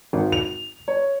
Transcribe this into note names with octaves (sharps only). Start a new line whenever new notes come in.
G#1
F7
C#5